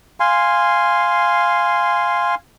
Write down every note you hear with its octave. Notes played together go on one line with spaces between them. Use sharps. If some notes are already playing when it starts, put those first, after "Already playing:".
F5 G#5 C6